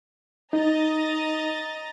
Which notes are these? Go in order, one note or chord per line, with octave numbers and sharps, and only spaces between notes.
D#4 D#5 A#5 A6